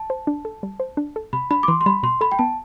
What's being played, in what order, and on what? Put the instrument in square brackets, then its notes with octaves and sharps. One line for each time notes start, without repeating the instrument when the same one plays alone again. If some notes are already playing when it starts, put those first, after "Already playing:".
Already playing: [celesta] A5
[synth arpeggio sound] C5
D4
A4
G3
C5
D4
A4
[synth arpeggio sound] C3 [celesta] B5
[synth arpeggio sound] D4 [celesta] B5
[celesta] D6
[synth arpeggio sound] E3 [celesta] C6
[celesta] C6
[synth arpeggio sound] G3 [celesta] B5
[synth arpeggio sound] B2 [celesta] C6
[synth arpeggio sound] A4 [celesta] B5
[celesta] G5
[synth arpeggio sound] B3 [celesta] A5